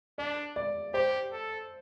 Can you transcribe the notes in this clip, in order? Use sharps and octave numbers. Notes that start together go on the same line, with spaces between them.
D4 D5
D5
G4 C5
A4